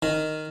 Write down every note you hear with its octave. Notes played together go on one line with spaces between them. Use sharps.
D#3